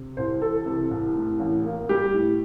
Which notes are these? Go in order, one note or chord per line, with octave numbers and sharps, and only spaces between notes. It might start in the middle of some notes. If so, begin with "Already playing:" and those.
Already playing: C3
C2 C5
E3 A4
C3
C2
A2
A1
A#3
G3 G4
A2